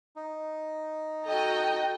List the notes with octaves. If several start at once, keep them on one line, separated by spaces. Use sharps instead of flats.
D#4
F#4 A4 D#5 G5 A#5